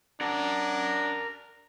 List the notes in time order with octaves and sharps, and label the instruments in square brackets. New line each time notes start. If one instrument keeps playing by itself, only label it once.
[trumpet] D4 [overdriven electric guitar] A#4 F#5